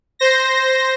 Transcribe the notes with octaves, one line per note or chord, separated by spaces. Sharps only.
C5 A#6